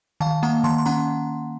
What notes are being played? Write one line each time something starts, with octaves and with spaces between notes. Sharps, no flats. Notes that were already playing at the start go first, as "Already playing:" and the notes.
D#3 F5 A5
A#3 F#5 A#5
D#3 A5 C6
C6
C#4 F#5 A#5